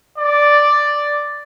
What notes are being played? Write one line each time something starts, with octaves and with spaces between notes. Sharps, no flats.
D5